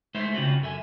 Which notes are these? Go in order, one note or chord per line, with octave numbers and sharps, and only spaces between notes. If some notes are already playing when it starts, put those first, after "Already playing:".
G#3 A3 E4 C5 E5
C#3 C4 F4 F#4
F#2 A4 E5 G#5